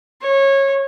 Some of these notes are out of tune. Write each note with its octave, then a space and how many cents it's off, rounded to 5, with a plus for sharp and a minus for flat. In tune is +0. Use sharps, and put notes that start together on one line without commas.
C#5 -20